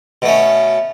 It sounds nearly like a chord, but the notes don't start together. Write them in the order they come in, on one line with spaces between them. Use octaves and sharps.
B2 A3 C#4